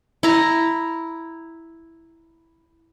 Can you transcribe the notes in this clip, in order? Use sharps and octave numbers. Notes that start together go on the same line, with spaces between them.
E4 A#5